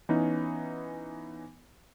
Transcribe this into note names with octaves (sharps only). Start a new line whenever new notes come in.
E3 B3 C#4 D#4